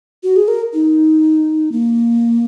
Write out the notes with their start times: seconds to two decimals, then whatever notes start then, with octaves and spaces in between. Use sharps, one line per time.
0.23 F#4
0.36 G#4
0.48 A#4
0.74 D#4
1.72 A#3